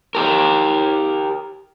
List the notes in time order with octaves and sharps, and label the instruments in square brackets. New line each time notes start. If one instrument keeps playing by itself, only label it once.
[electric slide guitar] G4 A#4